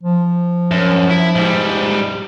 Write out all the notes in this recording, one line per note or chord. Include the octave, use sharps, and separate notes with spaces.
F3
F#2
E4
G#2 G3